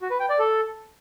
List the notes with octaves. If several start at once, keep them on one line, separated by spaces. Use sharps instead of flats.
F#4
B4
G5
D5
A4